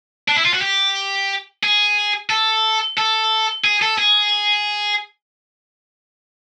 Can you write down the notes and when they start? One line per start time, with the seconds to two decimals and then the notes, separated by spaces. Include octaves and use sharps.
0.28 D4
0.37 E4
0.45 F4
0.54 F#4
0.61 G4
1.63 G#4
2.30 A4
2.97 A4
3.64 G#4
3.82 A4
3.98 G#4